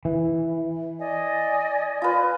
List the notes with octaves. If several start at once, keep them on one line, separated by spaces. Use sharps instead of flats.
E3
D5 D#5 G#5
F4 B4